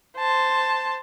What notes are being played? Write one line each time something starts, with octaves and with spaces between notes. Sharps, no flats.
C5 A5